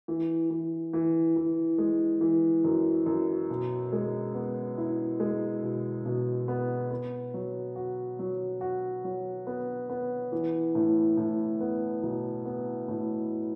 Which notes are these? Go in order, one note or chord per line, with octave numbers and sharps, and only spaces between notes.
E3
E3
E3
E3
G#3
E3
F#2
F#2
B2
G#3
B3
E4
G#3
B2
B2
B3
B3
F#3
F#4
F#3
F#4
F#3
B3
B3
E3
A2
A2
B3
B1
B3
A2